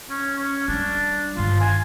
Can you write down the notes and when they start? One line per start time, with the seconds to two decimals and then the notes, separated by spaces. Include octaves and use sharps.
0.10 C#4
0.38 C#4
0.68 G3 D4
1.37 G1 D#3 F4
1.61 G#5